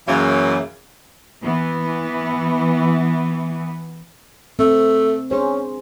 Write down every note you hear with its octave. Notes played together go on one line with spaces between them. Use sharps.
F#2 C#3 E3 F#3 A#3
E3 B3
A3 C4
C#4 D4 G#4 C5